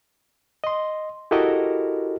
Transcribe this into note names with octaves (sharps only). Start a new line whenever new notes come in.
D#5 C6
E4 F#4 G4 A4 A#4 D#5